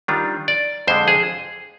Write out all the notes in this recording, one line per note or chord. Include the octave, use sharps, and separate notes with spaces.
D#3 G3 D4 F4
D5
F2 D3 G#3 C5
G#4